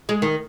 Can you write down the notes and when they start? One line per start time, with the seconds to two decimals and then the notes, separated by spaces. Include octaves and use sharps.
0.09 G#3
0.22 D#3